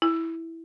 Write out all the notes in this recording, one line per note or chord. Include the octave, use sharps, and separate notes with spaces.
E4